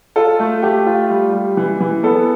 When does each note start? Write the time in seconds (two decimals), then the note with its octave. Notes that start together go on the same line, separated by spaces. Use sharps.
0.16 F4 A4
0.40 A3
0.62 A3 G4
0.86 F4
1.10 G3
1.33 G3
1.57 E3
1.80 E3
2.03 B3 A4